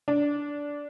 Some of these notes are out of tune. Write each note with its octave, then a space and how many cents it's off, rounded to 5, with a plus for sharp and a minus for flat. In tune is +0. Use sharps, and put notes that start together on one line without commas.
D4 -15